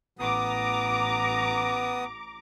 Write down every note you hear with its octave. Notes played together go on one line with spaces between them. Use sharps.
A1 B3 A#5 D6 D#6